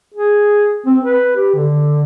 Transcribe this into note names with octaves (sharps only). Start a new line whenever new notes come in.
G#4
C4
B4
G4
D3